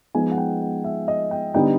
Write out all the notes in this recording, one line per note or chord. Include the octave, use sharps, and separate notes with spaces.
F3 G#3 B3 D#4 G#5
F#5
G5
F#5
E5
D#5
G5
D3 G3 B3 D#4 G5